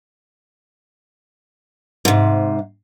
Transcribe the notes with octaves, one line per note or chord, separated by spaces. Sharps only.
G#2 C3